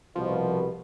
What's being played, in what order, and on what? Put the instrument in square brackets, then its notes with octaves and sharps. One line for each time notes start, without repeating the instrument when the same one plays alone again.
[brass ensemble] C2 B2 [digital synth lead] F3